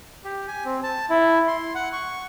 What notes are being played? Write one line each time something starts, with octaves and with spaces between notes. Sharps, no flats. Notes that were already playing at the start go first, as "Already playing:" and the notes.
G4
G#5
C4
A5
E4
C6
F#5
C#6